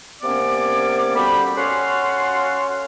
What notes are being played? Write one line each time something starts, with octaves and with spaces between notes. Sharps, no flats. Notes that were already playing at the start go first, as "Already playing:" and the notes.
C3 A#3 B3 C#4 D5 D6
G3 F#4 A4 C5 B5
C#4 F#4 A4 F5 F#5 C6